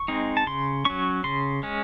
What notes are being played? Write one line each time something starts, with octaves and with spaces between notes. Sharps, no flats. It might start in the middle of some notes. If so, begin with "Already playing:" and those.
Already playing: C#6
G#3 C4 D#4
A5
C#3 C6
F#3 C#4 C#6
C#3 C6
G#3 C#4